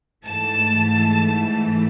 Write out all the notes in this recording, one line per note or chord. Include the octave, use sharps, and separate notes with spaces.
G#2 E3 A3 A5